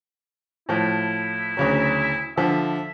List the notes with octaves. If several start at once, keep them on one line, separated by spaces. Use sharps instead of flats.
A2 F3 E4
D2 C#3 F#3
D3 F3 E5